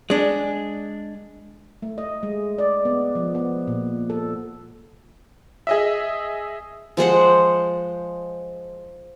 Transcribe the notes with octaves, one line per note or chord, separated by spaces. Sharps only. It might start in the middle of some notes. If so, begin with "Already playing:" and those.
G#3 D4
A3
D#5
G#3
D5
B3
F3
B3
A#2
A4
G#4 D#5 E5
F3 G#3 C5 F#5